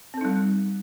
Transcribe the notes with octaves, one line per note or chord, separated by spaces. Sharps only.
G3 C4 D#4 A4